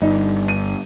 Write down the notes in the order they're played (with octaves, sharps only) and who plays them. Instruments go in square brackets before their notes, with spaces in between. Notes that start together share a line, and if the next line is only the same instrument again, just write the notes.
[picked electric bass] G1 G3 [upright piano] D#4
[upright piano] D#7